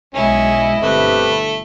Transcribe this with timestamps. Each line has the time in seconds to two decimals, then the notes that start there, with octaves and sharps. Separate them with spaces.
0.15 B1 B2 G#3 C#4 E4 D#5
0.82 G1 A3 C4 G4 B4